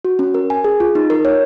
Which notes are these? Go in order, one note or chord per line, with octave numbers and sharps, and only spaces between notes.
F#4
C#4
A#4
G#5
G#4
F4
D#4
A#4
C#5